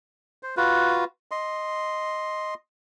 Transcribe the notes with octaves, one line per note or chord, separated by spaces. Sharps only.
C5
F4 F#4 B4
D#5 C6